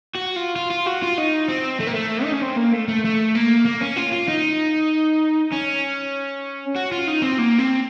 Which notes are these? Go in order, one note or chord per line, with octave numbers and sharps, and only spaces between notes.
F#4
F4
F4
F4
F#4
F4
D#4
C4
A3
A#3
A3
D#4
C#4
C4
A#3
A3
A3
A3
A#3
A#3
C#4
F4
F4
D#4
C#4
F#4
F4
D#4
C4
A#3
C4